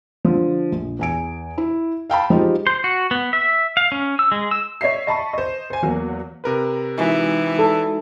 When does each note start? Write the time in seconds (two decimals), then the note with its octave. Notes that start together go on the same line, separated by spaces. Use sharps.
0.25 D3 F3
0.72 A#1
0.99 E2 G#5 D7
1.58 E4
2.10 F5 G5 A5 B5
2.30 F3 G#3 D#4 F4 G4
2.67 C5
2.84 F#4
3.11 B3
3.33 E5
3.77 F5
3.92 C#4
4.19 E6
4.32 G#3
4.51 E6
4.81 C#5 D#5 E5 C7
5.07 D#5 A5 B5 C#6
5.33 C5 D#5
5.70 C5 G#5
5.82 E2 F#3 A#3
6.44 C3 A#4 B4
6.98 E3 G#3 D#4 F#4
7.59 A4